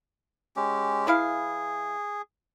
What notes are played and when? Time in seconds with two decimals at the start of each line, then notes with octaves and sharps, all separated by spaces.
0.56 G#3 C#4 G4
1.07 E3 E4 G#4 F5